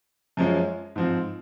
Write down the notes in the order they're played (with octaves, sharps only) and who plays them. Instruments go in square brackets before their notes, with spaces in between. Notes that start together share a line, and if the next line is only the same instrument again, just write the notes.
[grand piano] F#2 F3 G#3 C#4
G#2 F3 C4